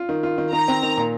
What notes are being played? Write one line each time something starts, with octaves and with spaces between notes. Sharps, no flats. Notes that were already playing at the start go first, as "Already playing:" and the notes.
Already playing: F4
D#3
F4
D#3
D#3 A#5
C4
D#3
A#2